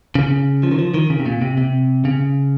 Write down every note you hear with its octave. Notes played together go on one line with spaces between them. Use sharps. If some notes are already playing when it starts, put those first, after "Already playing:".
C#3
F3
D#3
F3
D#3
C#3
C3
A#2
C3
C3
C#3